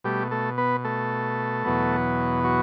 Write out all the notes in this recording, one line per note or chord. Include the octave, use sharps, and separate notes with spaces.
B2 G3 A3 G4
A3 A4
B3 B4
A3 A4
E2 B2 F#3 B3
F#3 F#4